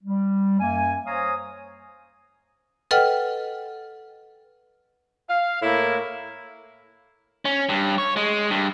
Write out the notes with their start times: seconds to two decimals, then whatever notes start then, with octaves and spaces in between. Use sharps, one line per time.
0.04 G3
0.60 F#2 A#3 G#5
1.07 C5 C#5 F5 G#5 A#5 D#6
2.91 A4 B4 D#5 F#5 G5 F6
5.28 F5
5.61 A2 A#3 E4
7.45 C#4
7.69 G2
7.98 C#5
8.17 G#3
8.50 G2